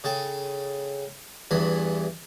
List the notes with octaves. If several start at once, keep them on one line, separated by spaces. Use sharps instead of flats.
C#3 A4 G5
E2 G2 E3 B5